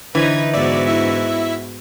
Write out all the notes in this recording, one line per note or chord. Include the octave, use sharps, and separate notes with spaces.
D3 E3 D4 D#4 B4 C5 G#6
G#2 B3 F#4 D5 E5
E4 E5